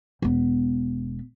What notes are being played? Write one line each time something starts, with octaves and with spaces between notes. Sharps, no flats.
E1 B3